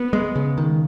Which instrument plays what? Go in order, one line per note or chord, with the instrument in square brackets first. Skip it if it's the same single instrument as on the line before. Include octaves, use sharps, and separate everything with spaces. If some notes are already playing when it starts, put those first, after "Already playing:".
Already playing: [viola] B3
[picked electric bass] G#3
C#3
D#3